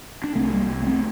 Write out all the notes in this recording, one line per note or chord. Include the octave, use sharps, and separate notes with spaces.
D4
C2 C3 A3 C4
G3 A#3
A#3
A3 C4